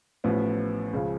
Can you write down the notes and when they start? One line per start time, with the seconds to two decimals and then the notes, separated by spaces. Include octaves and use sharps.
0.24 A1 A2 F3 B3
0.93 C#2 C#3 F3